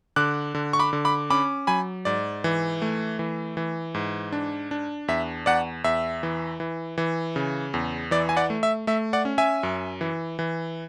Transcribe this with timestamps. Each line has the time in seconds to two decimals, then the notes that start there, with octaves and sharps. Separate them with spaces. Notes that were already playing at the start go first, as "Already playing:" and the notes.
0.16 D3 D6 F#6
0.55 D3
0.73 C#6
0.79 B5 D6
0.93 D3
1.05 B5 D6
1.30 C#4 B5 D6
1.67 F#3 G#5 B5
2.05 G#2 D5
2.44 E3
2.82 A3
3.19 E3
3.57 E3
3.95 G#2
4.32 D4
4.71 D4
5.08 E2 E5
5.46 E2 D5 F#5
5.84 E2 E5
6.23 E3
6.60 E3
6.98 E3
7.36 C#3
7.74 E2
8.11 E3 D5
8.29 G#5
8.37 D5 F#5
8.50 A3
8.63 E5
8.87 A3 E5
9.13 D5 F#5
9.25 C#4
9.38 E5 G#5
9.63 F#2
10.01 E3
10.39 E3